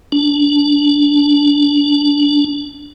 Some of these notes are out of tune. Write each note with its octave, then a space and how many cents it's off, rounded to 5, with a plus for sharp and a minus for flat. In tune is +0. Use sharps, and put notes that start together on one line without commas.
D4 -20